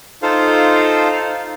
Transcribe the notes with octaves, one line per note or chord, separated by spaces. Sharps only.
D#4 F4 A4 C5 F5